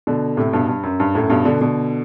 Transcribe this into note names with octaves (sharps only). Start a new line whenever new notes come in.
B2 D3
A2 C3
G2 B2
G2
F#2
G2
F#2 A2
G2 B2
B2 D3
B2 D3